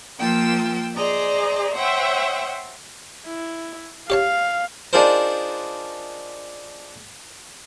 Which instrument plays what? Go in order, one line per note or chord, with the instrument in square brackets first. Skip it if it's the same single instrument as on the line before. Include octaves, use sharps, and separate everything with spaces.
[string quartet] F3 A#3 F4 G5 E6
G#4 C5 D5 D#5 A#5
C5 C#5 E5 F#5 G5
[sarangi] E4
[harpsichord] G4 C#5 A5 [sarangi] F5
[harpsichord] D4 D#4 F4 G#4 A#4 C5